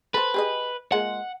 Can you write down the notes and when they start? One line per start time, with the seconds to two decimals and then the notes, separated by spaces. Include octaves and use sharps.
0.14 A4 B4 C5
0.34 G4 G#4 D#5
0.92 G#3 A#3 F4 F#5